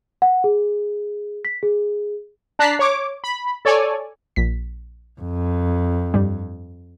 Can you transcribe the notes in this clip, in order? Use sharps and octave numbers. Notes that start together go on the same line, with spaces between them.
F#5
G#4
B6
G#4
D4 A5 A#5 F#6 B6 C7
C#5 D6
B5
A4 C#5 D5 G#5
A#1 B6
F2
G2 G3